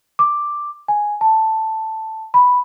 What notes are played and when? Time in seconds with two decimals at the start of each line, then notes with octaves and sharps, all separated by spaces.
0.19 D6
0.88 G#5
1.21 A5
2.34 B5